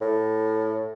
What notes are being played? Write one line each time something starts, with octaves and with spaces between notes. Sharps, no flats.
A2